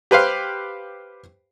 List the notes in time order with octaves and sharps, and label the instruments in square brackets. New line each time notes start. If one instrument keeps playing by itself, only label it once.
[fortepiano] G4 B4 C5 F5